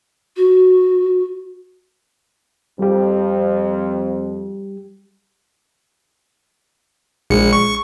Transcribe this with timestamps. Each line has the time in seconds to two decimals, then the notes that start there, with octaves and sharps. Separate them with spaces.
0.37 F#4
2.79 F2 G3 G4
7.30 A#1 G#3 C#7
7.53 C#6